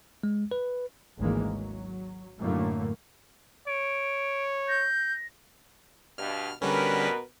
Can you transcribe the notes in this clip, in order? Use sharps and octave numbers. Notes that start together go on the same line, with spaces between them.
G#3
B4
G#1 D2 D#3 E3 G#3 A#3
F#3
F#2 A2 D3 F#3 A3 A#3
C#5 D7
G6 A#6
G2 B2 F6
B2 D3 G3 C#4 A#4 B4